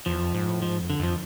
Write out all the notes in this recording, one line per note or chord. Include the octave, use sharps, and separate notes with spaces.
E2 F3
F2
G#2
A2
G#2 F3
F2
D3
F2 F3